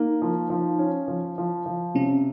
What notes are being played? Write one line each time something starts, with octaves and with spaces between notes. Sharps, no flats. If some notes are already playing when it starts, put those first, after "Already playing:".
Already playing: A#3 D#4
F3
F3
C#4
F3
F3
F3
C3 C#4